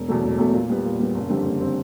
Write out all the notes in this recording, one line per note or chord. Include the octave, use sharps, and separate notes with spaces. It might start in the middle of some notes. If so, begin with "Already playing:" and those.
Already playing: E1
E2 B2 F#3 A3
E1
E2 B2 F#3 A3
A#2
G3 B3
A#2
G3 B3
F#1
F2 D3 G3 C4
F#1
D3 G3 C4